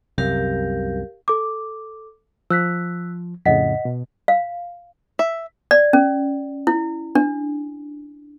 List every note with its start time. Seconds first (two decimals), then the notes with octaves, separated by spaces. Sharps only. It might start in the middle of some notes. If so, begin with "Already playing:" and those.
0.18 C2 F#2 C3 G4 A#4 F5
1.28 A4 D6
2.50 F3 E6 F#6 B6
3.46 F2 A2 C#3 D#5 F#5 B6
3.85 B2
4.28 F5
5.19 E5
5.71 D5
5.93 C#4
6.67 E4
7.15 D4